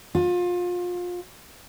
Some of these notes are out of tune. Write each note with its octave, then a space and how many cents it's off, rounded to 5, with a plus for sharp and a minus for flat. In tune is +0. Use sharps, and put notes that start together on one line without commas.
F4 +25